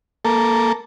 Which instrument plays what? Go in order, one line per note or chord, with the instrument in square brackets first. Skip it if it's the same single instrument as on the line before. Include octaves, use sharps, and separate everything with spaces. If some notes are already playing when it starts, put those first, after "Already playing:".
[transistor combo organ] A#3 A4